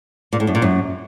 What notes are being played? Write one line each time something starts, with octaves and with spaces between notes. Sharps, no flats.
A#2
A2
F#2
A#2
F#2